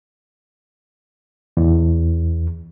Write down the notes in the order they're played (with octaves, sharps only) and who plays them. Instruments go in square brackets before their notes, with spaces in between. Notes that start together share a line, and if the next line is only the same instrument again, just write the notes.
[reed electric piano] E2